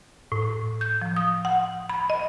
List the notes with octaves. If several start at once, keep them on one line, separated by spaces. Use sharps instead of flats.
A2
G6
F3
D#6
F#5
B5
D#5